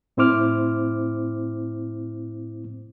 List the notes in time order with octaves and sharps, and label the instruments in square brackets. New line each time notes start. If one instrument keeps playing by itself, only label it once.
[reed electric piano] A2 C4 E4 C5 D6 F6